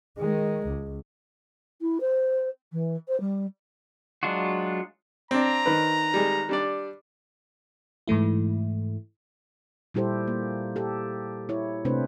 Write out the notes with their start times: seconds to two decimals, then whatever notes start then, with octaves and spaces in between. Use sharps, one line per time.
0.19 D#3 G#3
0.68 C#2
1.81 E4
2.00 C5
2.72 E3
3.08 C5
3.20 G3
4.23 F#3 G#3 D4 F4 F#4
5.31 C4 D4 A#5
5.66 D#3 B4
6.14 G3 G#3
6.49 G3 D4 D5
8.08 G#2 E3 A3 E4
9.94 A#2 G3 E4 G4 A4 C5
10.27 A#3
10.76 G4 A4
11.49 E4 C#5
11.85 C3 A3 C4 D4 B4 C5